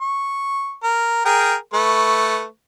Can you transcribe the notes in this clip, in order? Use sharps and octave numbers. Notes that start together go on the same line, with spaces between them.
C#6
A#4
G#4 A#4 G5
A3 B4 C#6